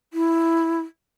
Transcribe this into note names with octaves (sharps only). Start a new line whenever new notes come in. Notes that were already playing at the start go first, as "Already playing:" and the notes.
E4